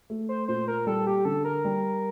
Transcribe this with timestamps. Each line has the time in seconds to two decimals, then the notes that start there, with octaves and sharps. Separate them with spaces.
0.10 A3
0.29 C5
0.48 A#2 C5
0.68 A#4
0.87 G3 A4
1.07 G4
1.25 D3 A4
1.45 A#4
1.65 G3